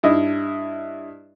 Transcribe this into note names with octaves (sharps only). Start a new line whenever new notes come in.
G2 E4 D#5